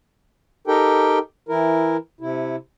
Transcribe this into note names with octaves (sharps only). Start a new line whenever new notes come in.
D#4 G4 A4 A#4 G5
E3 E4 A#4
C3 E4